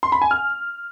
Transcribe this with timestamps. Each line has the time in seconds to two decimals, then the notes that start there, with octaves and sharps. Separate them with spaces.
0.03 C6
0.12 B5
0.22 G#5
0.31 F6